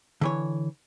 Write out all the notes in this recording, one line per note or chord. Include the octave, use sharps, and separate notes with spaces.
D3 E3 C#5